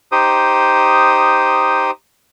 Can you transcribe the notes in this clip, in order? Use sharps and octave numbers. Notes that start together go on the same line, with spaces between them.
D#4 G4 C5 D#6